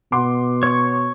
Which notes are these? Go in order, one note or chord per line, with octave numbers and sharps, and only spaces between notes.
B2 F#5 C6 D6
C#5 C#6